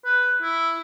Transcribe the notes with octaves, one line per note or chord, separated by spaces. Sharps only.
B4
E4